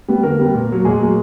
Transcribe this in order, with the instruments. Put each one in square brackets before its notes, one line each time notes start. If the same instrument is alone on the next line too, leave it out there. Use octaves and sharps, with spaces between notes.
[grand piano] G3 B3
D3 A#3 A#4
G3 B3
A#2
F#3 A#3
A#2 G#3 G#4
F#3 A#3